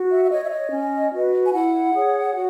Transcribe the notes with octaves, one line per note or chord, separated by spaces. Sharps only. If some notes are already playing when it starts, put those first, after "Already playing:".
Already playing: F#4
E5
E5
C#5 D#5
E5
D#5
C#4
F#4 B4
G#5
E4 F#5
G#4 C#5
F#4